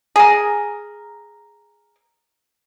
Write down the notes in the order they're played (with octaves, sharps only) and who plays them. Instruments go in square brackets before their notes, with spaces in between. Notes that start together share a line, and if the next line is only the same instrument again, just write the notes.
[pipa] G#4 A#4